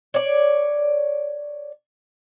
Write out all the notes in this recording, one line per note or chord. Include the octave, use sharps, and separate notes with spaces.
C#5 D5